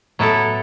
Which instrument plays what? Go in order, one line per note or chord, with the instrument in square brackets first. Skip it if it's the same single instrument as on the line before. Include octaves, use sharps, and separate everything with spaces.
[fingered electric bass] A2 [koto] F#3 B3 E4 A4